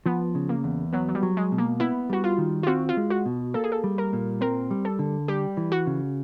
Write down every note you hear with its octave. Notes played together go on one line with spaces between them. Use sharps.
F3 B3
C#3
A#3
E2
F#3 B3
F#3
G3
F#3
G#3
B2
A#3
B3 E4
G3 F#4
F4
D#3
F4
C4 F#4
F4
G#3
F#4
B2
A#3 A4
G#4
A4
G3
A#4
A#2
C4 A#4
G3
A4
D3
G3 G4
E3
F#4
C#3